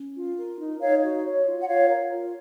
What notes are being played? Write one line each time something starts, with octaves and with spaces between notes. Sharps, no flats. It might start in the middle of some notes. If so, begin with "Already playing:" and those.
Already playing: C#4
F4
A#4
D#4
D#4 C#5 F5
F#4
C#5
F4
F#5
F4 C#5 F5
A#4
F4